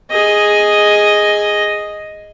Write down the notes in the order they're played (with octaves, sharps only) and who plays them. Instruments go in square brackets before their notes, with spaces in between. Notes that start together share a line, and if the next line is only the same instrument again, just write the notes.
[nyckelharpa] G#4 D#5